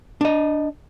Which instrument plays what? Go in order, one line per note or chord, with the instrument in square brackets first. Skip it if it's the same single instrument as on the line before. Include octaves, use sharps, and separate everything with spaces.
[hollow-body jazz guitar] D4 D#5